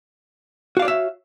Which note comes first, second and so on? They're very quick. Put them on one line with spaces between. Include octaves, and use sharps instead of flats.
F#4 F5 D5 C#5 E5